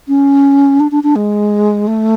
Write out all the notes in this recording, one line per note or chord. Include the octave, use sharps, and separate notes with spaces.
C#4
D4
D4
D4
G#3
A3